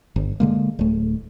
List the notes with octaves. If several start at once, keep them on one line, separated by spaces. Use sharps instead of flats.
G1
D3 G#3 A#3
D1 A3